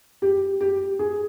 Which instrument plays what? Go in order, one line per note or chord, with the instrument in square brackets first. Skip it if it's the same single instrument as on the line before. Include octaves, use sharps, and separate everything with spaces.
[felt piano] G4
G4
G#4